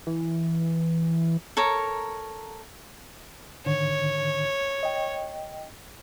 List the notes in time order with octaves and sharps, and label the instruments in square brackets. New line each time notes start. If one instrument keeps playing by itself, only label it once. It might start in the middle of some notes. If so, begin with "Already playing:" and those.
[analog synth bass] E3
[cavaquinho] A4 A#4 C#5 A#5
[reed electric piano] G#2 D3 D#3 [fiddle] C#5
[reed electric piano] D#5 G5